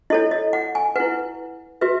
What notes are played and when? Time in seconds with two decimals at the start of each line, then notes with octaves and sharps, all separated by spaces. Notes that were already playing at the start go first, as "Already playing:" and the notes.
0.10 E4 A4 C#5 D#5
0.31 D#5
0.53 F#5
0.75 G#5
0.96 E4 B4 F#5
1.81 F#4 B4 E5